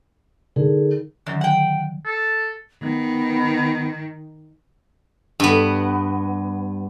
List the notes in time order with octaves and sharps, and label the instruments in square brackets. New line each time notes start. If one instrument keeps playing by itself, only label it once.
[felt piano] D3 [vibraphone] D#4 G#4 A#4
[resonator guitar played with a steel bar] F#2 [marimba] D3 D#3 F#3
[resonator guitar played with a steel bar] F#5 G5
[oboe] A4
[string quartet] D#3 [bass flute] B3
[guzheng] G2 B3